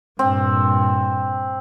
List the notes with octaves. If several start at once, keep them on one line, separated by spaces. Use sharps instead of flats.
G2 A#2 C4